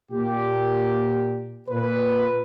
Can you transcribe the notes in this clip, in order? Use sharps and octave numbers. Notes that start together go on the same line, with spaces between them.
A#2 G4
A#2 B4